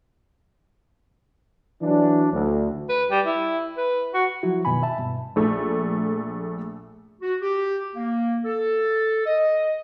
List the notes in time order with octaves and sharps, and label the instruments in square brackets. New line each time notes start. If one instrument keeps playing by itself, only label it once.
[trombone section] E3 F#3 D4
D2
[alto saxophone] B4
G3
E4
B4
F#4
[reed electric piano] F3 F#3 E4 F#4
F#2 B2 D#3 G#5 B5
E5 A5
G2 B2
[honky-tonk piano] A#1 A3
[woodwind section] F#4
G4
A#3
A4
D#5